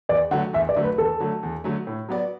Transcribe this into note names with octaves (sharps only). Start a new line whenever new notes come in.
E2 D5
D3 F#3 A3 F#5
E2 E5
D5
D3 F#3 A3
B4
E2 A4
D3 F#3 A3
E2
D3 F#3 A3
A2
F#3 B3 F#4 D5